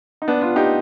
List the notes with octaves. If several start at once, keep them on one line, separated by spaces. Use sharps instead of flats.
D#4
B3 D4
D4 F4
D#4 G4